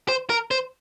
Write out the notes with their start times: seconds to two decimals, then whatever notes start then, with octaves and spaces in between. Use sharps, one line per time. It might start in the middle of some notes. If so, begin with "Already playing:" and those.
0.09 C5
0.30 A#4
0.51 C5